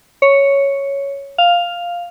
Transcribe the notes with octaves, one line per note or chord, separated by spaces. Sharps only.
C#5
F5